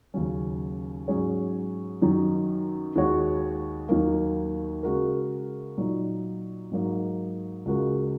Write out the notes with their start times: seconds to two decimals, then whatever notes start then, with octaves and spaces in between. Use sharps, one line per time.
0.14 D#2 C#3 F#3 C#4
1.08 G#2 F#3 C#4 G#4 C#5
2.02 F#2 D#3 F#3 D#4
2.96 D#2 D#3 G#3 F#4 C#5
3.89 D#2 D#3 F#3 A#3
4.83 C#3 G#3 F#4 A#4
5.78 A#2 F#3 D#4
6.72 G#2 F#3 A#3 D#4
7.65 C#2 C#3 G#3 F#4 A#4